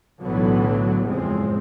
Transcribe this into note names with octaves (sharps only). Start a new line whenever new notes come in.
B1 A2 D3 E3 F#3 B3
F#1 E2 A2 F3 G#3 C4